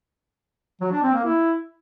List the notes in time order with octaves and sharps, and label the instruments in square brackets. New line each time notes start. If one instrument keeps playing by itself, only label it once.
[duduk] F#3
D4
C4
A#3
E4